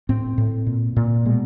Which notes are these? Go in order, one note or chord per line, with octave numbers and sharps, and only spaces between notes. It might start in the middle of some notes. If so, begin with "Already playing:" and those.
A2 C4
A2
A#2
A#2
B2 G#3